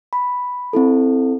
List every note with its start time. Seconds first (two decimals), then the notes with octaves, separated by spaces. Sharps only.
0.13 B5
0.73 C4 E4 A4